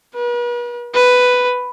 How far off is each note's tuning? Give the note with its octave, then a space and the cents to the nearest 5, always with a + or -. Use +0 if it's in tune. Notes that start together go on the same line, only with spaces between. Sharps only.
B4 -45
B4 +5